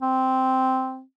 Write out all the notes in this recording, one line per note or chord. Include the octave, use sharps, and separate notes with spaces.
C4